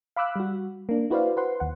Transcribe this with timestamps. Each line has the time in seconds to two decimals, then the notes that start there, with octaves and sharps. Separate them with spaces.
0.16 F5 B5 D6 E6 F#6
0.36 G3 F#4
0.89 A#3 D4
1.10 E4 F#4 B4 C5 D5 F5
1.37 B4 C5 F#5 C6
1.60 D#2 F#5